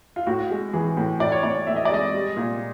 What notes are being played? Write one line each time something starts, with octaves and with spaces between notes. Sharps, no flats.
F4
A2 F#4
G#3
E3 G#4
A2
A2 D5
C#5
A2 D5
A2 E5
D#5
D5
G#3 D#5
G3
A#2